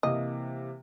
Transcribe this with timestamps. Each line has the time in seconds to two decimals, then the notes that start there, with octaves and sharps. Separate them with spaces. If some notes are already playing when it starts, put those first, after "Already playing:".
0.03 C3 E3 A#3 D#5